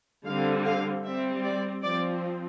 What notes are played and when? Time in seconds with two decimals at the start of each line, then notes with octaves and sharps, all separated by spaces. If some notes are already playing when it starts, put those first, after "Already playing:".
0.25 D3 G3 C4 F5
0.64 F5
1.03 G3 C4 E5
1.43 D5
1.82 F3 C4 D5